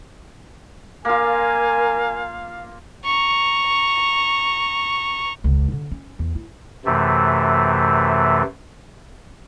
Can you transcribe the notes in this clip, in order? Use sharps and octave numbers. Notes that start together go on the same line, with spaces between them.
A#3 F4 A#4 F5 G#5
A#5 C#6
E1 C#2
D3
C#4
E2
E4
F#2 C3 E3 A3